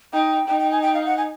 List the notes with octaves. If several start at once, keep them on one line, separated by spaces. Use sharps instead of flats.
D#4 G5
D#4 G5
G5
G#5
G5
F5
F#5
G#5